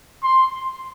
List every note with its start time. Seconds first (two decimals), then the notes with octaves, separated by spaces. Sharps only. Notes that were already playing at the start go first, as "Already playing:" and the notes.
0.23 C6